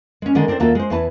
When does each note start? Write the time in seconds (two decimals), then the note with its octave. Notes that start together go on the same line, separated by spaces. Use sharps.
0.22 G#3 C#4
0.35 D3 D#3 G#3 D#5 F#5
0.48 C4 D4 A4 A#4 C5
0.60 D#2 A3 A#3 F4 F#4 A4
0.75 G#3 C5
0.90 E2 E3 E4 G#4 B4 A5